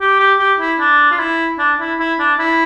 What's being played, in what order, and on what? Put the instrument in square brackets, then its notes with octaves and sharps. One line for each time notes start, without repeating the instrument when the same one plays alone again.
[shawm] G4
G4
G4
E4
D4
F4
E4
D4
E4
E4
D4
E4